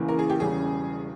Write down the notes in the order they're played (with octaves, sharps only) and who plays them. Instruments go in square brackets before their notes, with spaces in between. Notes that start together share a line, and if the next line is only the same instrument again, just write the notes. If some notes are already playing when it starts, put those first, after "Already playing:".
Already playing: [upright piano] E2 C#3 E3 A#3 C#4
[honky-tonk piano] A#4
G#4
G4
[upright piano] E1 E2 C#3 G3 C#4 [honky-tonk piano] G#4